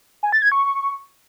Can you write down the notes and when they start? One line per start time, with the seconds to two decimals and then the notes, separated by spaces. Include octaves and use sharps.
0.23 G#5
0.32 A6
0.42 G#6
0.52 C#6